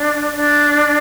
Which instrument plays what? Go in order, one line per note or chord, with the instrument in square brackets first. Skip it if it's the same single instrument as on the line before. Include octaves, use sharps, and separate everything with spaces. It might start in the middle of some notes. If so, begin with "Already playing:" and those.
Already playing: [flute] D4
D4